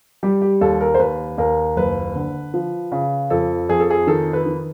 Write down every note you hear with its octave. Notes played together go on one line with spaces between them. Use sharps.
G3 G4
G4
D#2 A4
A#4
C5
D#2 B4
D#2 A#4
F#1 B4
D3
F3
C#3
F2 A4
F2 G#4
A4
G#4
D#3 A4
B4
D#3